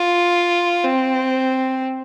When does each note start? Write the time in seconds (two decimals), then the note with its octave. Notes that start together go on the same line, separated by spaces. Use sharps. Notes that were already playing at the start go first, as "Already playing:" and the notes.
Already playing: F4
0.84 C4